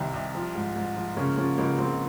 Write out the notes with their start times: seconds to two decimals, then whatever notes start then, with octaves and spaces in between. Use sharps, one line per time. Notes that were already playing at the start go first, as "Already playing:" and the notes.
Already playing: C2 C3 D#3
0.14 C2
0.35 F3
0.55 G#2
0.76 G#2
0.96 F3
1.17 C#3 A#3 C#4
1.37 F3 A#3 C#4
1.57 C#2 A#3 C#4
1.78 C#2 C4